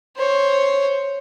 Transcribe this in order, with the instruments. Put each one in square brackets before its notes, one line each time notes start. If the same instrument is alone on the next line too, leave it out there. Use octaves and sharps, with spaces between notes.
[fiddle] C5 C#5